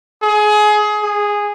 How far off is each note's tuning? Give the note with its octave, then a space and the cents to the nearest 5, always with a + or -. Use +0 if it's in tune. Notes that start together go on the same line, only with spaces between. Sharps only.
G#4 +25
G#4 -10